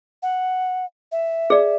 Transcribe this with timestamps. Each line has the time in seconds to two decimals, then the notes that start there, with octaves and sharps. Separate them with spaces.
0.23 F#5
1.12 E5
1.50 G#4 D5